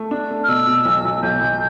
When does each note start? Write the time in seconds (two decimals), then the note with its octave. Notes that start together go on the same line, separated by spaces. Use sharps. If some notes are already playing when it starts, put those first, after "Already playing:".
Already playing: A3
0.11 D4
0.31 A3
0.44 F6
0.48 B2 E6
0.67 B2
0.85 B1
1.05 B1
1.23 B1 G6
1.41 B1